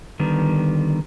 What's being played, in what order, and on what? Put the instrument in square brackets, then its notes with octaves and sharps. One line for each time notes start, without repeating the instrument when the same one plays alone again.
[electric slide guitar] D3 D#3 G3 B3